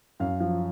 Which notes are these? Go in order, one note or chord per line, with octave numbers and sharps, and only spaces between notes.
F#2 F5
F3 F5